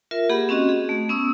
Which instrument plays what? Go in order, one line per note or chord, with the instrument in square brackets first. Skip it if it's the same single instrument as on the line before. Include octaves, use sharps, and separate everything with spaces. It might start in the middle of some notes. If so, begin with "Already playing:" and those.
[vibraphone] F4 A#4 E5
A#3 G4 G#4 F#5 B5
C4 C#4 F#4 D#5
G#4
A3
B3 C#4 D#6 E6